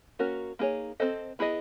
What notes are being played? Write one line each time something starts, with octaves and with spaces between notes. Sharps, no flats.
A#3 C#4 F#4 A#4
A#3 D#4 G#4 C#5
C4 E4 A4 C5 D#5
B3 E4 G#4 C5 D#5